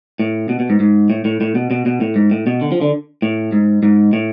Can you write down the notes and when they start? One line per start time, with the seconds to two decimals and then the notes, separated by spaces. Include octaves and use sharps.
0.19 A2
0.49 B2
0.60 B2
0.70 G#2
0.80 G#2
1.10 A2
1.25 A2
1.41 A2
1.55 B2
1.71 B2
1.86 B2
2.01 A2
2.16 G#2
2.31 A2
2.47 B2
2.61 D3
2.72 F3
2.81 D3
3.22 A2
3.52 G#2
3.83 G#2
4.13 A2